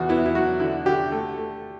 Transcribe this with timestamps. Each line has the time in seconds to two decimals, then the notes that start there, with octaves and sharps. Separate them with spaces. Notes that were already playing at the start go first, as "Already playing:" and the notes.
Already playing: E2 F#4
0.09 B3 E4
0.26 E4
0.35 F#3 F#4
0.60 D3 E4
0.86 D3 G4
1.12 A3
1.38 A3